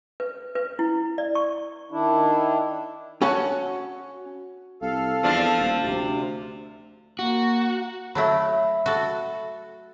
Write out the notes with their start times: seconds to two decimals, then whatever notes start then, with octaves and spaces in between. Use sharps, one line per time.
0.20 B4
0.55 B4
0.79 E4
1.18 D5
1.35 C#6
1.91 D#3 D4 E4
3.21 C#4 F#4 C#5 F#5 G#5 A5
4.82 C2 A4 F5
5.23 E2 F3 D4 F4
5.59 D#1
5.83 D2 C3
7.19 A#3 F#4
8.15 F#3 A3 E4 E5 B5
8.86 F#4 A4